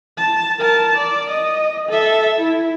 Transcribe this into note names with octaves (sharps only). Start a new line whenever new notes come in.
A5
A#4 A5
D5
D#5
A4 E5
E4